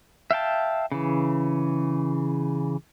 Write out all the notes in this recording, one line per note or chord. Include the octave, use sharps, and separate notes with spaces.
E5 F5 G5 A5
C#3 E3